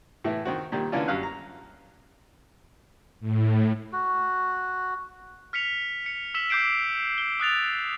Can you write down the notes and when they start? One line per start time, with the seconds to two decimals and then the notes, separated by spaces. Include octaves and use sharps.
0.24 A2 E3 E4
0.45 D#3 C4 F#4
0.72 A#2 D#3 G3
0.92 D3 E3 A#3 C#4 D4 F4
1.08 F#2 G3 F5 F#6
1.23 A#5
3.20 A2
3.93 F#4
5.53 F6 B6 C#7 F7
6.06 C#7
6.34 E6 B6 E7 G7
6.49 D6 E6 G6 C7 D7 E7
7.18 G7
7.40 D#6 F#6 A6 F7